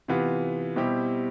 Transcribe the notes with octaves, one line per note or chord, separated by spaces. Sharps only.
C3 E3 B3 F4
B2 G3 C4 E4 G4